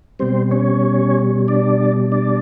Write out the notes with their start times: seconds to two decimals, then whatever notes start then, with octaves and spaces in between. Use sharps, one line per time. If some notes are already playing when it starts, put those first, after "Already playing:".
0.19 B2 G3 C4 C5
0.51 C#4 C#5
1.48 D4 D5
2.12 D4 D5